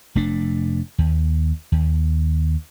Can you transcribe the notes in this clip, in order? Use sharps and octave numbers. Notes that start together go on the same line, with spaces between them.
F1 A3 D4
D#2
D#2